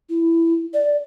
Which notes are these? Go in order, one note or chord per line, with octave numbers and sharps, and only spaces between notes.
E4
D5